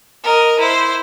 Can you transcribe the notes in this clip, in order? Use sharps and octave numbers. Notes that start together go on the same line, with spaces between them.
A#4 D#5
E4 C5